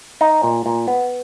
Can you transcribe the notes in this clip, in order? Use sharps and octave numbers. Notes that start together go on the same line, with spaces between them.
D#4
A#2
A#2
B3